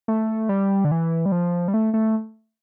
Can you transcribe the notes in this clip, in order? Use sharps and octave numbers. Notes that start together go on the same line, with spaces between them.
A3
G3
D3
E3
G3
F3
G3
A3
A3